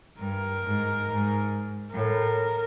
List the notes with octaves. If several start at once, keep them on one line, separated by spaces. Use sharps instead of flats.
G2 A#4
G#2
G#2
A2 A#4